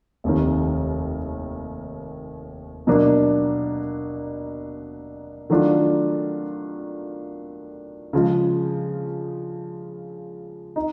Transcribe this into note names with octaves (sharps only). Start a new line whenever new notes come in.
F1 D#2 D#3
B2 F#3 A#3 D4
D#3 F#3 A3 D4 F4
C#3 F3 G#3
D#4